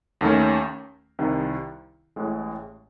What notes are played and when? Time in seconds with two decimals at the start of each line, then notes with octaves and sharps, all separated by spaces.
0.21 D#2 D#3 A3 C#4
1.19 C2 C3 D#3
2.16 A1 A2 G#3